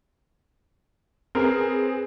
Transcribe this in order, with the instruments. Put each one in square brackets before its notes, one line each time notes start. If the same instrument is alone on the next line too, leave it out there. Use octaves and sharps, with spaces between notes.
[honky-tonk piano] C4 G#4 B4 [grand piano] A#4